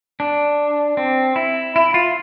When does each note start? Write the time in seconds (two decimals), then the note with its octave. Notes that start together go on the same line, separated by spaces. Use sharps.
0.20 D4
0.97 C4
1.36 E4
1.76 E4
1.94 F4